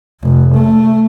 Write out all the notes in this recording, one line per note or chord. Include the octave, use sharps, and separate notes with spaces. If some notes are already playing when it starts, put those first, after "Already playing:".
F1
A3